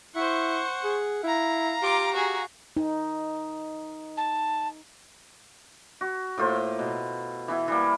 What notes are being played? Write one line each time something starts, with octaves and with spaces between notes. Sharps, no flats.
E4 C5 F#5 C#6
G#4
E4 F5 A#5
F4 G4 D6
F#4 G#4
D#4
A5
F#4
A2 A#3 F4 C5
B2
E3 B3 E4
E3 G3 A#3